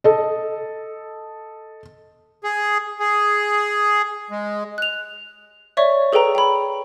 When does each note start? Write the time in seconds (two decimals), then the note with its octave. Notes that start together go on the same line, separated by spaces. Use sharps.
0.04 A4 D#5
2.44 G#4
3.00 G#4
4.30 G#3
4.78 F#6 F7
5.77 C#5 D5 E5 C#6
6.13 G#4 A4 B4 G5 A#5
6.35 G5 B5